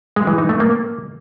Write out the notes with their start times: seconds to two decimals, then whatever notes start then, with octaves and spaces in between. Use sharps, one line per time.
0.16 G#3
0.27 E3
0.38 D#4
0.49 A3
0.60 A#3